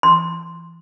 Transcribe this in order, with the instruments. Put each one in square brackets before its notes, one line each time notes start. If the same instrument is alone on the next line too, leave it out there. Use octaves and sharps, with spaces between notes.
[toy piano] C6